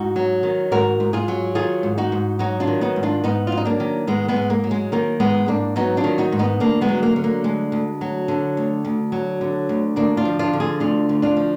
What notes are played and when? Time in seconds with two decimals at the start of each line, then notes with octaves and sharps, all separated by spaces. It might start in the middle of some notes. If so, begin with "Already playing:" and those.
Already playing: G#2 D#4 F#4
0.16 F#3
0.43 D#3
0.71 G#2 F#4 A#4
1.00 G#2
1.13 F4 G#4
1.28 F#3
1.55 D#3 F4 G#4
1.83 G#2
1.98 D#4 F#4
2.12 G#2
2.39 F#3 D#4 F#4
2.60 D4 F4
2.67 D#3
2.81 B3 D#4
2.96 G#2
3.03 D4 F4
3.24 G#2 B3 D#4
3.47 F4
3.52 F#3
3.57 D#4
3.65 A#3 D4
3.80 D#3
4.07 G#2 G#3 B3
4.28 G#3 B3
4.36 G#2
4.50 A#3
4.64 F#3
4.71 G#3
4.92 D#3 A#3
5.20 G#2 G#3 B3
5.48 G#2 A#3 D4
5.76 F#3 B3 D#4
5.97 D4 F4
6.04 D#3
6.18 D#4 F#4
6.32 G#2
6.39 B3 D#4
6.60 D2 A#3 D4
6.81 G#3 B3
6.88 F#3
7.03 A#3
7.16 D3
7.24 A#3
7.44 D2 G#3
7.72 D2
8.01 F#3
8.28 D3
8.57 D2
8.85 D2
9.12 F#3
9.41 D3
9.69 D2
9.96 D2 A#3 D4
10.17 D4 F4
10.25 F3
10.39 D4 F4
10.53 D3
10.60 F4 G#4
10.80 D2 D4 F4
11.09 D2
11.22 D4 F4
11.37 F3